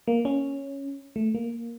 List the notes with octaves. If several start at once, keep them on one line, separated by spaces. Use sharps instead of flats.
A#3
C#4
A3
A#3